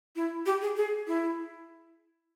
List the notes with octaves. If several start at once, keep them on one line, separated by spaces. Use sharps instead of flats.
E4
G4
G#4
G#4
E4